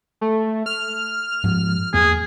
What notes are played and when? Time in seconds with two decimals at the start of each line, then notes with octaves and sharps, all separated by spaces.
0.21 A3
0.66 F6
1.44 G#2 F3
1.94 E2 A#3 G#4